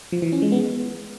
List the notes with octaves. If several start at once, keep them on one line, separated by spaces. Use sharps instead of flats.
F3
E3
C#4
G#3
B3